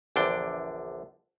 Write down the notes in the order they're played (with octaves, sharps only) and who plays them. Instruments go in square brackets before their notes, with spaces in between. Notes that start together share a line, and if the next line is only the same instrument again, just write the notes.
[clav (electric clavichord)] A#1 E2 D3 D4 G5